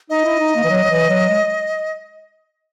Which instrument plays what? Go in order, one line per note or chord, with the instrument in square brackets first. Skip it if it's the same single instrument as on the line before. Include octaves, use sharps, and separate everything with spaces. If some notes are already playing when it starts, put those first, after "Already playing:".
[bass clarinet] D#4 [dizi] D#5
[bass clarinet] E4
D#4
A#3
E3
F#3
F#3
E3
F#3
G#3